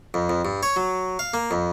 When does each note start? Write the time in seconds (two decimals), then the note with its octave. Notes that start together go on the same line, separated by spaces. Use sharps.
0.14 F2
0.30 F2
0.45 G2
0.63 C#5
0.76 F#3
1.19 F5
1.34 A#3
1.51 F2